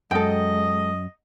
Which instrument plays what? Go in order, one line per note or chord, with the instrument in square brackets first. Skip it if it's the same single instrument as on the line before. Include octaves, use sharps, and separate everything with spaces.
[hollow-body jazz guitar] F#2 [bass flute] G#3 [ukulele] A4 G5 [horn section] D#5